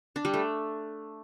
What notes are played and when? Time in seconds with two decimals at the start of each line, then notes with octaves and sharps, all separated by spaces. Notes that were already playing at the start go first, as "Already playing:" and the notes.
0.16 D4
0.25 G3
0.34 A3